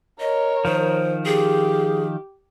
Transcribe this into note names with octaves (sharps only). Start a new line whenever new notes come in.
A#4 C#5 D#5
D#3 F3 C5
G4 G#4